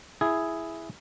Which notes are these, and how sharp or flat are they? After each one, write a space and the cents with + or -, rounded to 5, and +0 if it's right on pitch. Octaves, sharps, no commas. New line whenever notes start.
E4 +0 G#4 +0